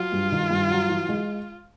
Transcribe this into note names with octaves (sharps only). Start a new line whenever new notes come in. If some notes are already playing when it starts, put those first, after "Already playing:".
Already playing: F#3 F4
G2
D#3
G2
F#3
E3
G#3